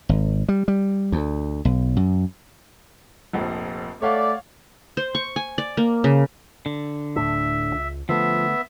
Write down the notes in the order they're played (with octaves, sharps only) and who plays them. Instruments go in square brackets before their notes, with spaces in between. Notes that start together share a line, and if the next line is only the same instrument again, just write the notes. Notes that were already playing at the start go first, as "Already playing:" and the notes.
[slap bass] G#1
G3
G3
D2
B1
F#2
[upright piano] F1 A#1 F2
[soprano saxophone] A3 [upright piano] C#5 F5 F#5 [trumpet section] D5
[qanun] C5
C#6
G#5
D5
A#3
C#3
[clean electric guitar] D3
[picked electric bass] D1 A2 D4 [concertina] E5
[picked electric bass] C#2
[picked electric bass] D3 A3 [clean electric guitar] F3 [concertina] B3 E5